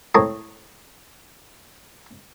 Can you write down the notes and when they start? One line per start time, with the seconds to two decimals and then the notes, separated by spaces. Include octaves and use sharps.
0.15 A2 C4 C#5 A5 A#5 D#6